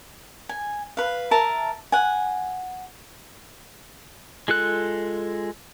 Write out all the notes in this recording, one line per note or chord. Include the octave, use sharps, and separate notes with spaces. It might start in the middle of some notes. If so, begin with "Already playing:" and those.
G#5
B4 F5
A#4 E5 A5
F#5 G#5
G#3 F4 A4 F#6